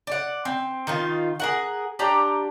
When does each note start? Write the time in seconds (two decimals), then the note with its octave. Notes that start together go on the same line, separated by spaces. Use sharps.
0.07 D5 F#5
0.45 C4
0.87 D#3 D#4 F4
1.40 G#4 A#4 F#5
1.99 D4 G4 D5 A#5